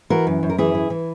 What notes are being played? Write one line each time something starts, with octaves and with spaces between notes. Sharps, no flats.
E3 F#4 A#4
F#2
F#2
A#4
E3 E4 G#4
E3
E3